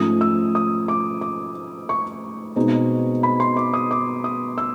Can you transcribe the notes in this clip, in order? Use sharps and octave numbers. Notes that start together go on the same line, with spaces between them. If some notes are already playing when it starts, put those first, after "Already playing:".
Already playing: G#2 F3 A3 C#4 D#6
E6
D#6
D6
D6
C#6
B2 G#3 C4 D#4
B5
C6
D6
D#6
D6
D#6
E6